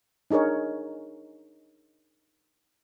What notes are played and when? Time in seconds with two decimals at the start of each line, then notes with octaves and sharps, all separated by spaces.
0.31 D4 D#4 G#4 A#4 C#5